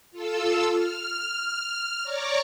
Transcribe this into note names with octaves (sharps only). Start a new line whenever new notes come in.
F4 A4 E6
F6
C#5 D5 A#5 C#6 D6